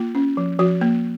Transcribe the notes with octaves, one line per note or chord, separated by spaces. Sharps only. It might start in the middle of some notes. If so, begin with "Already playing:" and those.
Already playing: A#3 F4
C#4
F3
F3 F#4
A#3